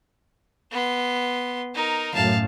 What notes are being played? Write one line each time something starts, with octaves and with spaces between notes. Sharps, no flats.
B3 C6
D#4 A#4
F#2 A2 F5 A5